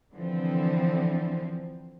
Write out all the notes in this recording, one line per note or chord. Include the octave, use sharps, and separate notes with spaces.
D3 E3 F3 C4